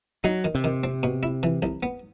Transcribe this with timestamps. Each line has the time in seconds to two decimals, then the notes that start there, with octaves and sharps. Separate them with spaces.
0.24 F#3 D#4
0.44 D#3
0.55 C3
0.64 D#3
0.84 C4
1.03 B2
1.23 E4
1.43 E3
1.62 C2
1.83 B3